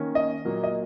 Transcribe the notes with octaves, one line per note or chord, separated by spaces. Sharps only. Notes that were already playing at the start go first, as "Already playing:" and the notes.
Already playing: D#3 A#3 C#4
D#5
A#2 F#3 A#3
D#5